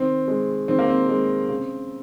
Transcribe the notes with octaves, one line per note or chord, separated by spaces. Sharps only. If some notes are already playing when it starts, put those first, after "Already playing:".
Already playing: D#3 C4
G#3
D#3 C4
A#3
C4
G#3
C#3